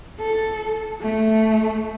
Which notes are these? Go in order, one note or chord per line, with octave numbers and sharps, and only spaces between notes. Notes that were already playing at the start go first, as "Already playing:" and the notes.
A4
A3